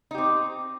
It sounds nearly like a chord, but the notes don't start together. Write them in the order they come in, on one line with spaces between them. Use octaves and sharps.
D#4 G4 C4